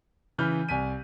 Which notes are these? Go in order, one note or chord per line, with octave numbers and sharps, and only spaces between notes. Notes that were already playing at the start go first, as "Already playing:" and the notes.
C#3 E3 B5 F6 G6
C2 G#5 B6 D#7